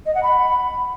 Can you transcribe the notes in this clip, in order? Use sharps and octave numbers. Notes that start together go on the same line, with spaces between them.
D#5
F#5
B5